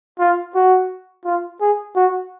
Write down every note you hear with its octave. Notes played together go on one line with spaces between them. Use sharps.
F4
F#4
F4
G#4
F#4